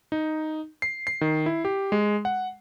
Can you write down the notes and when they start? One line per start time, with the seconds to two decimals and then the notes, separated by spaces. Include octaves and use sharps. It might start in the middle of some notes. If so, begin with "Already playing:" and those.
0.12 D#4
0.82 C7
1.07 C7
1.21 D#3
1.46 E4
1.65 G4
1.92 G#3
2.25 F#5